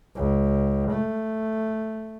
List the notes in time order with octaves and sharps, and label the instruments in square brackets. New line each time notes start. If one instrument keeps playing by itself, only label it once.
[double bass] C#2
A3